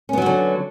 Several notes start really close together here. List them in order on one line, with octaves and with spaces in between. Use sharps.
C#4 B3 F#3 F#4 D3